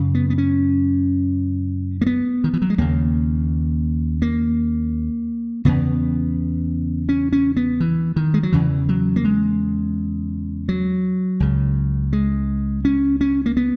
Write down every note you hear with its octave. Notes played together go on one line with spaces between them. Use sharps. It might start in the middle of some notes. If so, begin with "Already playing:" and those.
Already playing: F#2 C#3
B3
B3
C#4
A#3
B3
D#3
E3
F#3
G#3
D#2 C#3 A#3
A#3
E2 C#3 B3
C#4
C#4
B3
E3
D#3
G#3
F#3
E2 C#3 E3
F#3
A#3
G#3
F#3
C#2 C#3
G#3
C#4
C#4
A#3
B3